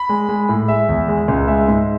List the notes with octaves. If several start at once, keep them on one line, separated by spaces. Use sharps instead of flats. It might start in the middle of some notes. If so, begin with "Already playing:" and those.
Already playing: B5
G#3
G#3
A2
G#3 E5
E2
G#3
C#2
G#3 E5
G#2